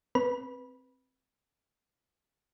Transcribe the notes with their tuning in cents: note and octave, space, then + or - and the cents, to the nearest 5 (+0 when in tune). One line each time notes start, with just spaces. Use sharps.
C4 +0 B4 +0 B5 -15